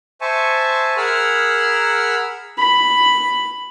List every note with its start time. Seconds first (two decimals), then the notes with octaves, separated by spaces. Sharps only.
0.21 C5 E5 G#5 A5 C#6
0.97 G#4 A#4 F#5 B5 E6 F6
2.58 B5